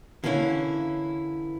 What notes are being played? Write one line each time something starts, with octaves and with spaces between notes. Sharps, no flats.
D3 E3 A#3 C#4 E4